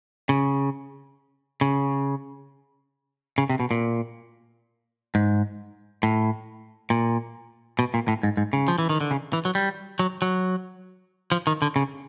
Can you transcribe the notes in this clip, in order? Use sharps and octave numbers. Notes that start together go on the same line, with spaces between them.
C#3
C#3
C#3
C3
B2
A#2
G#2
A2
A#2
B2
A#2
A2
G#2
G#2
C#3
F3
E3
D#3
D3
C#3
E3
F#3
G3
F#3
F#3
F3
D#3
D3
C#3